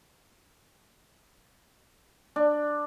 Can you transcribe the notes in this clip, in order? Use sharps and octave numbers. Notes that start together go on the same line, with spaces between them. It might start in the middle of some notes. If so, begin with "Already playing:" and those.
D4